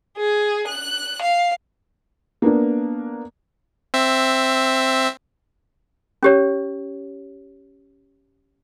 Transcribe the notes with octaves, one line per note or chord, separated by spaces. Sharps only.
G#4
F#6
F5
A#3 B3 D4
C4 E5
C#4 G4 C#5